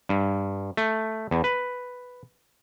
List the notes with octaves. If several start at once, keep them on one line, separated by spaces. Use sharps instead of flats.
G2
A3
E2
B4